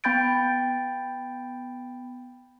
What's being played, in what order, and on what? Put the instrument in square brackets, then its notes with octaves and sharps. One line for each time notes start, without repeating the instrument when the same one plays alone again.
[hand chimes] B3 G5 B5 G6 A6 D7